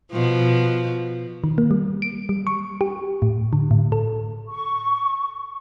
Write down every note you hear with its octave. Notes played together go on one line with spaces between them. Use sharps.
B2 F3
D#3
A#3
G3
D7
G3
C#6
G4
A2
D3
A2
A4
C#6